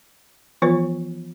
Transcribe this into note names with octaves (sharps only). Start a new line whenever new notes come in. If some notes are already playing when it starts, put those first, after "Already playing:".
E3 F3 B3 F4 B4 C#5